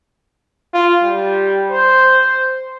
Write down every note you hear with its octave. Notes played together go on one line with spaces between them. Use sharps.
F4
G3
C5